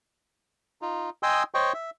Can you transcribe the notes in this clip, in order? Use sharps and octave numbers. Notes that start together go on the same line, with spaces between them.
D#4 F4
D#5 G5 G#5 C6 D#6 E6
C5 C#5 D#5 G5 C#6
E5